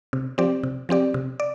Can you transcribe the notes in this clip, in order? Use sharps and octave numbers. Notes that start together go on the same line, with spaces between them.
C3
F3 C4 G4 D5
C3
F3 C4 G4 D5
C3
D5